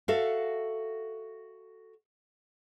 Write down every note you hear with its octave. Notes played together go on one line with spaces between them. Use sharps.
F#4 A4 E5 F5